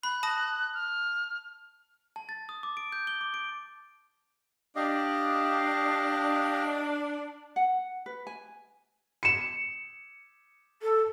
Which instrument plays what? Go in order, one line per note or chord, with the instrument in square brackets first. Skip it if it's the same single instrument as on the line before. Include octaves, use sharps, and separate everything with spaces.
[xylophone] B5 [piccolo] F#6
[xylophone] A5 D#6 A#6
[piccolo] F6
[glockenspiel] A5
A6
D#6
D6
D7
G6
G7
D6
D7
[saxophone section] D4 [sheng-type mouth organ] G4 D#5 F5
[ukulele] F#5
B4
G#5
[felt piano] C#7 E7
[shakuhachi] A4